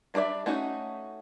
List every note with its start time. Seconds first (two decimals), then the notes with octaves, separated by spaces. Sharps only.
0.14 G3 D4 A4 D5 E5
0.46 A3 C#4 D#4 F#4